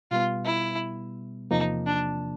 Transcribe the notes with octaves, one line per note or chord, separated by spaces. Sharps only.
B2 G3 B3 F4
E4
E2 C3 F3 A#3 D#4
D4